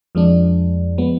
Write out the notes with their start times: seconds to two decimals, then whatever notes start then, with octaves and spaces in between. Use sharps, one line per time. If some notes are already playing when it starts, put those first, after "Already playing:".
0.15 F2 F3 G#3 D4
0.98 F3 G#3 B3